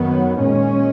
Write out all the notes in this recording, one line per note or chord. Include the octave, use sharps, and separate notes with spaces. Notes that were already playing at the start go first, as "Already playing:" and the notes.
Already playing: F#2 D#3 F#3 B3
A#2 G#3 C#4